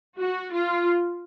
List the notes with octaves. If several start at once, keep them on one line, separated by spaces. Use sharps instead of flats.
F#4
F4